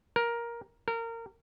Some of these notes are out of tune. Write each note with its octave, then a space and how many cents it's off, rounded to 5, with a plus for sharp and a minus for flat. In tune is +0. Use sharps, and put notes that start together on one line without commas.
A#4 +10
A#4 -25